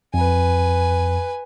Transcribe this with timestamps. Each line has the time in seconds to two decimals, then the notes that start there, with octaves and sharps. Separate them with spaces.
0.14 F2 B4 G#5